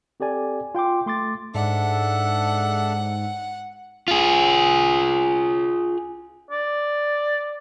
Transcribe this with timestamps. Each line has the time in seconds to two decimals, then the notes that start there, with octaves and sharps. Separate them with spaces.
0.20 C4 G4 A4 D5 G#5
0.75 F4 G5 C6 D6
1.06 A3 C6 D6 A6
1.55 G#2 D4 A4 E5 F#5
4.08 F4 G#4
6.51 D5